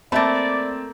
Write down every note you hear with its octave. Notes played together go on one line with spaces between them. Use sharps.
A3 A#3 C4 D5 E5 B5 A6